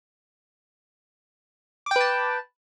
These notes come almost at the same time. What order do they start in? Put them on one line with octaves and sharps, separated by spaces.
D6 G5 B4 A5